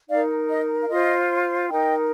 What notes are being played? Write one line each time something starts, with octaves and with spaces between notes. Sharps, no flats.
D#4 A#4 D5 F5
D#5
F5
F4 C5 D#5
D#4 A#4 D#5 G5